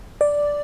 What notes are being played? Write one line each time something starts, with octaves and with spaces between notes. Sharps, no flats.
D5